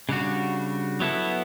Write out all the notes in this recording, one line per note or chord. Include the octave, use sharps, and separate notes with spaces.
C#3 G3 D4 F#4
F#3 B3 E4 A4